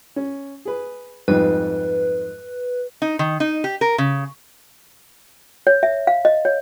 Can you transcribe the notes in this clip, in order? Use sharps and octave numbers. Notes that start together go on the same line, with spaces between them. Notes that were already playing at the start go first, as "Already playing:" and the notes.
C#4
G#4 B4
F2 G#2 G3 B4
D#4
D#3
D#4
G4
A#4
C#3
C#5
E5
F5
D#5
C#5